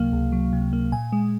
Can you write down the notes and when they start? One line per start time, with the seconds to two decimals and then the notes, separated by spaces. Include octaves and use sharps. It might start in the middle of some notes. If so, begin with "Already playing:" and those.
Already playing: C#2 C3 F#3 A#3 F5
0.13 C#2
0.32 F#3
0.53 C3
0.73 A#3
0.92 A#2 G#5
1.12 G#3